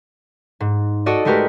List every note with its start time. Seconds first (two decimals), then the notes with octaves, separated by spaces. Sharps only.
0.60 G#2
1.06 F#4 A4 D5 D#5
1.25 G#3 A3 F#4 G4 A#4 B4